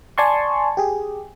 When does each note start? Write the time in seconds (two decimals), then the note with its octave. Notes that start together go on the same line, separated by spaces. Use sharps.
0.18 D5 G#5 A5 C6 C#6
0.77 G4 G#4